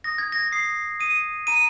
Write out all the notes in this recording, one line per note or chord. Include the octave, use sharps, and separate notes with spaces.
D#6 A#6
G#6
A#6
D#6 C7
D#6 D#7
A#5 D#7